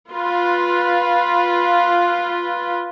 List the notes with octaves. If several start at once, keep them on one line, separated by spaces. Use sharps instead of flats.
F4 B4